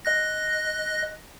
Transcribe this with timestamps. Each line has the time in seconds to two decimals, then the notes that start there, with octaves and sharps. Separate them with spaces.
0.05 D#5 F#6 A#6